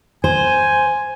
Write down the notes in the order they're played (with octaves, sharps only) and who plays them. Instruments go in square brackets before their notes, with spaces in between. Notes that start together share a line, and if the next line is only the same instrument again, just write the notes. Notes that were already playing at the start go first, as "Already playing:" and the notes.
[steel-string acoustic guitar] C5 [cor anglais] G#5